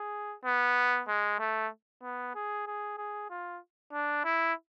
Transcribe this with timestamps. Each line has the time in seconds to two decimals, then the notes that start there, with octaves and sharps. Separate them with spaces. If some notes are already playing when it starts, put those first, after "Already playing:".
Already playing: G#4
0.45 B3
1.08 G#3
1.39 A3
2.03 B3
2.35 G#4
2.67 G#4
2.98 G#4
3.30 F4
3.93 D4
4.25 E4